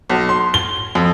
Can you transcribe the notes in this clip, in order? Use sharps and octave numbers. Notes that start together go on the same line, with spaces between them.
B1
C6
G7
F2